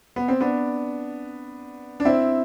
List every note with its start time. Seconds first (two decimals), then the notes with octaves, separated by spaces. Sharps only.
0.16 B3
0.28 C4
0.41 B3 D4
2.00 D4
2.05 C4 E4